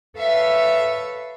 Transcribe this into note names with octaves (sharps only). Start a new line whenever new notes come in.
A4 B4 C#5 E5 F5